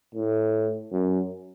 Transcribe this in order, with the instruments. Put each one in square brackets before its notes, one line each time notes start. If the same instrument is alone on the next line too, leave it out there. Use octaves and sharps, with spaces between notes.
[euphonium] A2
F#2